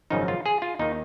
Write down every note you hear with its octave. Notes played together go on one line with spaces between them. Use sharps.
G#1 F#2 C#3 F3 D#4
F4
G#4
F4
D#2 D#3 D#4